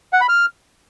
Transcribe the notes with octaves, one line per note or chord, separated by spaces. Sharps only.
F#5
B5
F6